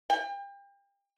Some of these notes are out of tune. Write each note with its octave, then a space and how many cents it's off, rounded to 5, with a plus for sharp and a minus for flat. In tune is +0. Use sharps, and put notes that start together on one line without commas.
G5 +35